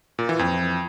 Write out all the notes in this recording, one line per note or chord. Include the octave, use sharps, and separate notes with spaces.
A#2
E3
F2